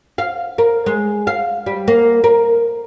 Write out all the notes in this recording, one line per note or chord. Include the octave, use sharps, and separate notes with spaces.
F5
A#4
G#3
F5
G3
A#3
A#4